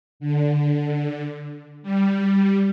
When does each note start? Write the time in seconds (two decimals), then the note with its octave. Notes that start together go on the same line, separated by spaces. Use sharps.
0.20 D3
1.82 G3